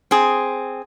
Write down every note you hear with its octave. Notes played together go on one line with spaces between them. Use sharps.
C4 G#4